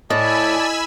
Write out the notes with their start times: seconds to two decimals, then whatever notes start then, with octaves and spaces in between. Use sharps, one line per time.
0.10 A2 D5 D#5 G#5 A5 B5 E6